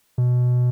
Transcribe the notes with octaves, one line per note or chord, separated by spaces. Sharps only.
B2